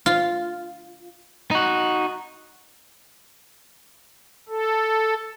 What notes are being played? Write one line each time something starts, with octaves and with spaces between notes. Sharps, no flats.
F4
D#4 F#4
A4